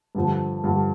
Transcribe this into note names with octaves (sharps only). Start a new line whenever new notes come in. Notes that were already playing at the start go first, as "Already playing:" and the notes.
G2 D3 F3
G2 D3 F3